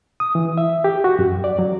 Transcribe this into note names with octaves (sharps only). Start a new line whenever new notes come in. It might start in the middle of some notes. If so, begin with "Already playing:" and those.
D#6
E3
E5
G4
F#4
F#2
D5
F#3